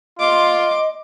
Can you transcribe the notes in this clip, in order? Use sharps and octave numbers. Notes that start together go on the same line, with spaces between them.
F4 D#5 C6 D6